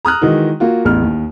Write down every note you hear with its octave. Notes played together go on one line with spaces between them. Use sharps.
A#5 D#6 F6 F#6
D#3 E3 G#3 D#4 F#4
A#3 F4 F#4
A1 E2 F6
D#2